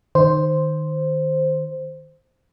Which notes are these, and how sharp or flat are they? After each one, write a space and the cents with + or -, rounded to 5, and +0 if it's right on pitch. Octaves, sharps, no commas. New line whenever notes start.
D#3 -10 C5 +0